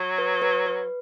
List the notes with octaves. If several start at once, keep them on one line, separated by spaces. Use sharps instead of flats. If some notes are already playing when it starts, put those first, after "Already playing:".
Already playing: F#3
B4
B4
B4